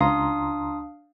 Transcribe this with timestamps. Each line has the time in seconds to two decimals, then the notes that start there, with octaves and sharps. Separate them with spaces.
0.01 C#2 D4 F5 A#5 C6 D#6